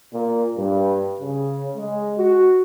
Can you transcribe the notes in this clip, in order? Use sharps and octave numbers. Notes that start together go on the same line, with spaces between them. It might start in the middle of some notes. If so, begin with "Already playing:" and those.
A#2
G2
C#3
G#3
F#4